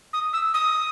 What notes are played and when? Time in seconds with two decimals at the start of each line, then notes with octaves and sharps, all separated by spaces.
0.13 D#6
0.33 E6
0.54 D#6